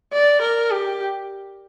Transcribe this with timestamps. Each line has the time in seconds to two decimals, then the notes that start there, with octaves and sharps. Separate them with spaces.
0.13 D5
0.41 A#4
0.71 G4